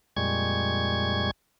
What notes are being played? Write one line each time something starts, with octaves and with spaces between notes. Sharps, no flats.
F2 A#2 G3 G#3 C#6 G#6